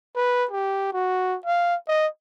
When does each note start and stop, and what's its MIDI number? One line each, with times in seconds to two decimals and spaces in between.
0.16 0.45 71
0.51 0.91 67
0.93 1.37 66
1.46 1.75 77
1.88 2.07 75